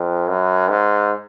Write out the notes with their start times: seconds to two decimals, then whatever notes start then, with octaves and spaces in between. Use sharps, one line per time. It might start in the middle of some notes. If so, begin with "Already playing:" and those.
Already playing: F2
0.28 F#2
0.69 G#2